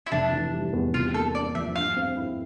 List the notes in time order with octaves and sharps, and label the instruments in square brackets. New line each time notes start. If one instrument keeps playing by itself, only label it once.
[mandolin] E4
[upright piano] F1 [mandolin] D4
[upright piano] E3
G3
E2
[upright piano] C3 [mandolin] F4
[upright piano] A#3 [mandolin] A4
[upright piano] D4 [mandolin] D5
[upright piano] F3 [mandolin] E5
[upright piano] G2 [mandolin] F5
[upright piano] C4
E4